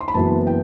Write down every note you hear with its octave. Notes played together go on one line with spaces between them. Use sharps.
C6
B5
F#1 F#2 E3 B3 A5
G5